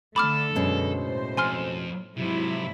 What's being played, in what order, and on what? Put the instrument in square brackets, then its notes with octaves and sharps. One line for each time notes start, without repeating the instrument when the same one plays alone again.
[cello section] D3 A3 [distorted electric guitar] A4 [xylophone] B5 D6 F6
[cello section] F#2 D3 [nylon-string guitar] B2 G#3 C#4
[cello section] A2 C5
[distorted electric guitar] F2 [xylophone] G#5 C6 F6
[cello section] G#2 F#3 E4 [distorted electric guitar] C3 F3